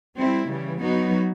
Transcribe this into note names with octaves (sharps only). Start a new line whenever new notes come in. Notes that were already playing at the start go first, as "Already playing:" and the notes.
G3 C4 E4
C#3 E3 G3
F#3 B3 D#4 F#4